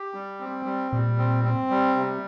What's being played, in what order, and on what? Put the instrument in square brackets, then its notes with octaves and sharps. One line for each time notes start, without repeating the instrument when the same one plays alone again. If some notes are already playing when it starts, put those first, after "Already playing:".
Already playing: [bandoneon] G4
G3
C4
G3
[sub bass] A#2 [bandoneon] G3
[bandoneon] C4
C4
G3
C3